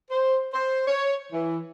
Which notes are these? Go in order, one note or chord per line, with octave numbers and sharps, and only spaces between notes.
C5
C5
C#5
E3